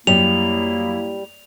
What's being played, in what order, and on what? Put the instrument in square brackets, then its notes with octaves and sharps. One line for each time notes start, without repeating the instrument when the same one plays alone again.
[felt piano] F#2 [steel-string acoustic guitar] G3 [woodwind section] A#3 E4 [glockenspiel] F7